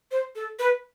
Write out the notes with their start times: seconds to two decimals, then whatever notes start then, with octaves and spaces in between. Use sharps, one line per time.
0.11 C5
0.36 A4
0.59 B4